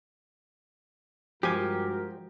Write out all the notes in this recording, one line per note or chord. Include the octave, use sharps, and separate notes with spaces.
G2 F3 G#3 F#4 G4 A#4 G#5